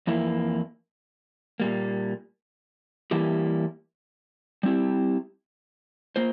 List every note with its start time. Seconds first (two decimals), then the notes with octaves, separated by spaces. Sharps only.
0.07 F2 E3 A#3 E4
1.60 A#2 G3 A#3
3.11 E3 G3 A#3 E4 G4
4.63 G3 C4 E4 G4
6.16 A#3 F4 C5